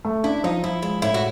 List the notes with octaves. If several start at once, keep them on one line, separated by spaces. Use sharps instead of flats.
A3
D4 E4
F3 D#4
F3 E4
G#3 E4
A2 E4
F#4